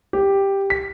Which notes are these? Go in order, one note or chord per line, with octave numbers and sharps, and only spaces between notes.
G4
B6